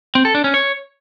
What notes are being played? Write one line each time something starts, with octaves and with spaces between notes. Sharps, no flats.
C4
A4
D4
C#4
C#5